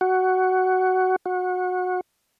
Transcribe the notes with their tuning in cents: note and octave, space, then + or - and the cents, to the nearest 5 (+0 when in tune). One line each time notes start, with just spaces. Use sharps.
F#4 +10
F#4 -20